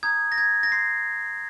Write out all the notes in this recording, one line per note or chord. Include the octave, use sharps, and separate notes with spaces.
A#5 D#6 G6 G#6
A#6
G#6
A#6
C6 G6 C7